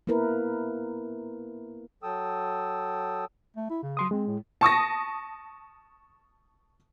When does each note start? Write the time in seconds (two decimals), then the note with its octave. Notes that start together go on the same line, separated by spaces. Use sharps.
0.07 A#3 B3 E4 A#4 B4
2.03 F#3 A4 G5 D#6 E6
3.57 A3
3.70 E4
3.83 C#3
3.97 F#3 C6 D#6
4.11 G#3 C4
4.27 A2
4.61 A5 C#6 D#6 A#6